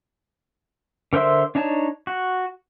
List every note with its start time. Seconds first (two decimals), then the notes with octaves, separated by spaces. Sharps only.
1.13 D3 A#4 C5 E5 C6
1.55 D4 D#4 C#5 A5
2.07 F#4